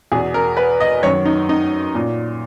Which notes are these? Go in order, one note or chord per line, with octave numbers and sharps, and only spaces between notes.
E2 B2 G#4
A#4
B4
D#5
F#2 D#3 C#5
D#4
D#4
A#2